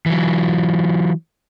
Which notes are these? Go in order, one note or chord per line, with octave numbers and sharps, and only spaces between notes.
E3 F#3